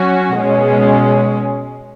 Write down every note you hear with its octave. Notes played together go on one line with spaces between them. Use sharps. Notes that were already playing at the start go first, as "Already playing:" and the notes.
Already playing: F#3 C#4 F#4
B2 G#3 C#4